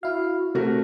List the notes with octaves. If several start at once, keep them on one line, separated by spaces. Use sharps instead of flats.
E4 F#4 F5
C3 A3 F#4 A#4